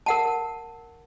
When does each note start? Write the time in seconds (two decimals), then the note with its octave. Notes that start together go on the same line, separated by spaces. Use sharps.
0.06 A#4 F#5 A5